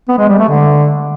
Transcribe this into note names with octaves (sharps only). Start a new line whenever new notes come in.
B3
G#3
G3
A3
D3